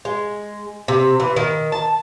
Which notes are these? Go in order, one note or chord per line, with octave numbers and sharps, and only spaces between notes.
G#3
C3
E3
D#3
A5